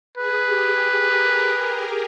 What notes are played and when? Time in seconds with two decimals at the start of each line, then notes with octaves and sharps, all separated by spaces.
0.17 G#4 B4
0.47 G4
0.76 G4
1.05 A#4